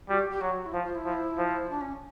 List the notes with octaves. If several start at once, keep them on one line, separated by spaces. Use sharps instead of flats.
G3 F#4
G4
G4
F#3 F#4
E4
F3 F4
F4
E4
F3
F3
D4
C#4